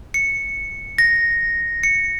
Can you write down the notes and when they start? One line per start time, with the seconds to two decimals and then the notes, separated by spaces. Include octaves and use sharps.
0.14 C#7
0.98 A#6
1.83 C#7